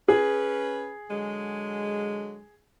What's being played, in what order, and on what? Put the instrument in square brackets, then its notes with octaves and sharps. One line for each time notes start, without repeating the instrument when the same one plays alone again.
[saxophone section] C#4 B4 [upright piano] G#4
[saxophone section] D3 F#3 G#3